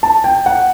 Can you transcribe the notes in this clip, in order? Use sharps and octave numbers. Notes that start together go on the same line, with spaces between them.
A5
G5
F#5